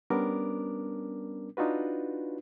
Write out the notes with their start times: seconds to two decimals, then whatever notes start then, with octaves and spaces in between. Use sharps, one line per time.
0.10 G3 B3 C#4 D4 A#4 D6
1.57 D4 D#4 F4 F#4 B4